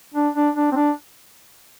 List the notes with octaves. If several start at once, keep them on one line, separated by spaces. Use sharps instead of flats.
D4
D4
D4
C4
D4